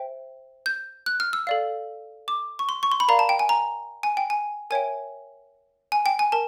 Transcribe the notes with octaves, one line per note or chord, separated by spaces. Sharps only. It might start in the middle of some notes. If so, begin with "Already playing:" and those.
Already playing: C5 E5 G5
G6
F#6
F6
E6
A4 D5 F5
D6
C#6
C6
C#6
C6
B5
A#4 D5 F5 A#5
A5
G5
G#5
A#5
G#5
G5
G#5
A#4 C#5 E5 G5 G#5
G#5
G5
G#5
A#4 A5